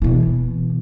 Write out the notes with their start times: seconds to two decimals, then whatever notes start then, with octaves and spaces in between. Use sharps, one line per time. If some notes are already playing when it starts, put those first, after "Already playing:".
0.02 B2 E3